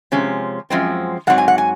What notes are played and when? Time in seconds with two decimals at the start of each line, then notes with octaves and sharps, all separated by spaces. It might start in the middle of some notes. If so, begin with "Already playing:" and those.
0.12 C3 F3 G#3 C#4
0.70 F#2 F3 G#3 C4
1.27 G#2 F#3 C4 F#5
1.38 G#5
1.48 F#5
1.58 G#5